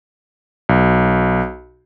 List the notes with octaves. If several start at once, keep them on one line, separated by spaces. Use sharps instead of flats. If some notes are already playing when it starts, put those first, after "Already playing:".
B1